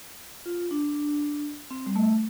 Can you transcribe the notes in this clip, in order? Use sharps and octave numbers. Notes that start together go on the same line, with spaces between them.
F4
D4
C4
G3
A3